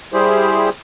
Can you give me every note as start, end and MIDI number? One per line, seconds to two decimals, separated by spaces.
0.13 0.69 55
0.13 0.69 64
0.13 0.69 67
0.13 0.69 68
0.13 0.69 72